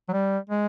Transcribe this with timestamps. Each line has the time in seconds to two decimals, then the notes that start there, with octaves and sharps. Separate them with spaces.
0.09 F#3
0.13 G3
0.49 G#3